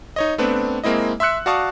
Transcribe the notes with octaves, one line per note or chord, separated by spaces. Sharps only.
D#4 C#5 D#5
A3 B3 C4 D4 B4
G#3 A#3 C4 E4 D#5
E5 C6 E6 F#6 C#7
F#4 D5 F5 A5 C#6 D#6